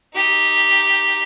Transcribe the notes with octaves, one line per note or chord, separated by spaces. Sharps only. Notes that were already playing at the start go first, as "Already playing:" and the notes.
D#4 G4